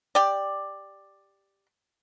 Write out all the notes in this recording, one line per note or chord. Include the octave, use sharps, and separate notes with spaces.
G4 D5